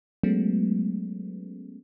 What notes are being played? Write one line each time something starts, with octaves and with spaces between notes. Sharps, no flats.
F#3 G#3 A3 B3 C#4